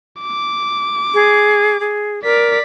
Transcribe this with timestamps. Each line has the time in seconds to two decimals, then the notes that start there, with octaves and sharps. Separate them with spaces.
0.21 D6
1.14 G#4
1.80 G#4
2.24 A#4 D5 B6